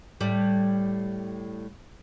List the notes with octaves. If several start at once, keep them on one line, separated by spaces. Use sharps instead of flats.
A2 G3